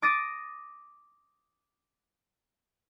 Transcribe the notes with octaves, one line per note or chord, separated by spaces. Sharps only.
D6 D#6 A6 A#6 D7 D#7